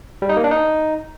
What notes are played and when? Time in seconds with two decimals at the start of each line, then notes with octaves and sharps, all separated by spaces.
0.22 G3
0.29 D#4
0.37 A#3
0.44 D4
0.51 D#4